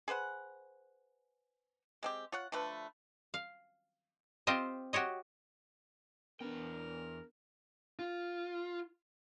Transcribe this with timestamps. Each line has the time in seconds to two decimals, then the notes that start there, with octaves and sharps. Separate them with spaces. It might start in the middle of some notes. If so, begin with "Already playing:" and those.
0.08 G#4 B4 C5 F#5
2.03 G#3 C4 G4
2.32 F4 C#5 F#5
2.52 D3 F3 A3 B4
3.34 F5
4.47 C4 F4 G4 C5 D#5
4.93 F#4 G4 C#5 D#5
6.40 E2 B3 D4 A#4 G5
7.99 F4